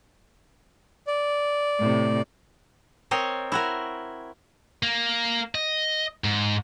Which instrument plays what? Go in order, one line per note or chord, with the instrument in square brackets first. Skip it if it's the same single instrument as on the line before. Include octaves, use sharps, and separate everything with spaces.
[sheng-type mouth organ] D5
[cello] A2 C3
[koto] C4 A#4 C#5 D#5
E4 F#4 A#4
[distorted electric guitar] A#3
D#5
G#2